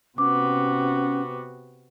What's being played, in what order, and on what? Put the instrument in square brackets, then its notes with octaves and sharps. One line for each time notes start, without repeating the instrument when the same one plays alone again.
[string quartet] C3 B3 F#4 [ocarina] C#4 [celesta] D6